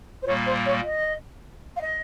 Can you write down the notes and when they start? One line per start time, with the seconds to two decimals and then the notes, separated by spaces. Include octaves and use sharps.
0.22 C5
0.26 A#2 G3 A#3 C#5
0.46 C5
0.65 C#5
0.84 D#5
1.76 F5
1.81 D#5